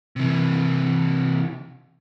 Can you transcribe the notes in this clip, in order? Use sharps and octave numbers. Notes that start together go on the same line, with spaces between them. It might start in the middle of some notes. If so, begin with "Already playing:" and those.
C3 E3